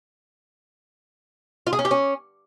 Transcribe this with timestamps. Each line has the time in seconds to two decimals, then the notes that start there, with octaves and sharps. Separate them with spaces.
1.67 F4
1.73 G#4
1.79 C#4
1.85 G4
1.91 C#4